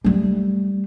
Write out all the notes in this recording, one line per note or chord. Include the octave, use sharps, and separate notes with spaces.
G3 A3